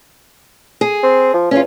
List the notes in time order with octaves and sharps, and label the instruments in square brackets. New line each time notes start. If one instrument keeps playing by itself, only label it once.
[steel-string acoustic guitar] G#4
[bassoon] C4
F3
[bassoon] E2 [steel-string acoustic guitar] C#4 F4